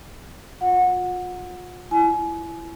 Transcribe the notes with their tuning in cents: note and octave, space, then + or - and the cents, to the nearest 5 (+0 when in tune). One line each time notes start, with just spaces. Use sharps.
F4 +30 F#5 -20
E4 +20 G#5 +30